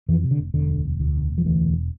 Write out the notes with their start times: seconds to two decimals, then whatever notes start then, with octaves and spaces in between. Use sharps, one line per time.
0.08 F2 E3
0.24 C3
0.31 D3
0.38 F1
0.54 E1 D3
0.69 D2
0.85 E1
1.00 D2
1.15 E1
1.30 E1
1.38 F3
1.45 D2 E3
1.61 E1